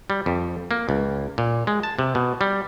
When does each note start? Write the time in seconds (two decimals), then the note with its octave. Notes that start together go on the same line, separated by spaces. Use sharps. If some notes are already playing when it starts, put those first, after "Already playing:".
0.10 G3
0.26 F2
0.71 A#3
0.89 C#2
1.38 A#2
1.67 G#3
1.83 A5
1.99 C3
2.15 B2
2.41 G3